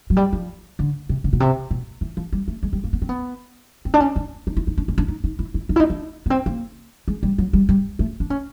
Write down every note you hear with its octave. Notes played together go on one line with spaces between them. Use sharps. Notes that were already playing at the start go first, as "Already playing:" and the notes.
F#3
G3
F3
D3
C3
D3
B2
C3
B2
E3
F3
G3
A3
G#3
G3
A#3
B3
C4
B3
C4
D4
C#4
D4
D#4
E4
D#4
D4
C#4
D4
D#4
D#4
E4
E4
D#4
E4
D#4
D4
B3
C4
A#3
G#3
G3
F#3
G3
G3
A3
D4
C#4